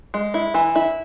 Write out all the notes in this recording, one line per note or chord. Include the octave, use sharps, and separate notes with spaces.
G#3
E4
E3
E4